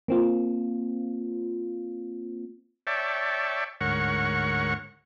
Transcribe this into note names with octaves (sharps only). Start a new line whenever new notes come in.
A#3 C4 F4
C#5 D5 E5 G5 A5
D2 G#2 A#4 C#5 F#5 C#6